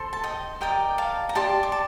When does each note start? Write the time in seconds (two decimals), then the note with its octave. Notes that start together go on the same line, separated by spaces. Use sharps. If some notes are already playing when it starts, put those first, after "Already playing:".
Already playing: A4 C5
0.13 A5
0.23 D#5 G5
0.61 G4 A#4 D5 D#5 G5
0.98 F5 A5
1.29 A#5
1.35 G4 D5 A5 C6
1.63 D6
1.72 A5